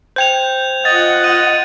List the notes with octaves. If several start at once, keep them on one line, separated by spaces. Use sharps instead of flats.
C5 G5 G6 G#6 F7
F4 D#5 F#5 A6
D#5 D#7